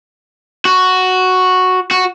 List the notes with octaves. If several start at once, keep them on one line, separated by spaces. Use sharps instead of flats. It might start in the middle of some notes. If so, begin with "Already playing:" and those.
F#4
F#4